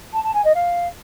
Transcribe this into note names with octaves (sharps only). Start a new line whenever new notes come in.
A5
A5
G#5
D#5
F5